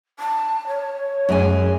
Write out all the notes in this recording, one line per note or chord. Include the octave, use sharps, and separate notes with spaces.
A5
C#5
F#2 G#3 G#5